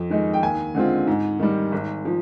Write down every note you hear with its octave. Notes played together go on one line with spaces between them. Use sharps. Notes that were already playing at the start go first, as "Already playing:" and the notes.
Already playing: F2
D#3 G#3 D#4
G5
D#2 G#5
D3 G#3 C4 F4
G#2
D#3 G3
G#1
F3